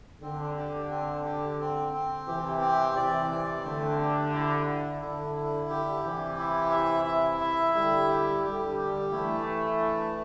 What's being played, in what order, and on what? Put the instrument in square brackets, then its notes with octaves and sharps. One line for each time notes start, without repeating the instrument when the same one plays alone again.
[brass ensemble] D3 [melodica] C4
[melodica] G4
C4
G4
C4
C4
[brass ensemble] C3 E3 [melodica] G4
[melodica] C4
[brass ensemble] C3 E3 [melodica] D5
[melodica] C4
[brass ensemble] D3 [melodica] A3
[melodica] G4
E4
E4
[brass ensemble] D3 [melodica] E4
[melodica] E4
[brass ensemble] D3 [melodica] G4
[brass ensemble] C3 E3 [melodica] G4
[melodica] E4
E5
E4
E5
[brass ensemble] D3 G3 [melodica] E4
[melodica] G4
[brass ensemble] D3 G3 [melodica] G4
[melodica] G4
[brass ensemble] E3 A3 [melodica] E4
[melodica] E4
D4